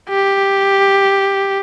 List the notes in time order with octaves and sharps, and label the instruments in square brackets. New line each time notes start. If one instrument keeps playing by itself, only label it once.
[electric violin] G4